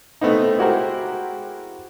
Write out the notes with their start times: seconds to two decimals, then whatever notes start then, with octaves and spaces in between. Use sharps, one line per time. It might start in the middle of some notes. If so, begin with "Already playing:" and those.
0.21 A3 B3 C4 D#4
0.58 G#3 E4 F#4 G4 A#4 C5